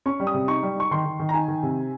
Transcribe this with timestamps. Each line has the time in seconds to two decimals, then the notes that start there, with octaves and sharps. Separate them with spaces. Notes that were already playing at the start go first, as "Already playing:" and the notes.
0.06 C#4 C#6
0.20 G3
0.27 D#6
0.34 C3
0.48 D#4 C#6
0.63 G3
0.76 D#4 C#6
0.91 D#3 C6
1.05 D#3
1.19 D#3
1.29 A#5
1.34 D#4 G#5
1.48 D#3
1.63 C3